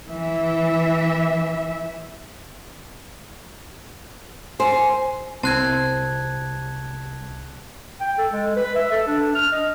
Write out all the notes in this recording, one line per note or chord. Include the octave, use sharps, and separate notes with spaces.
E3 E5
C5 G#5
C2 C4 A5 F#6 G#6
G5
A4
G#3
B4
E5
A4
D4
F6
D#5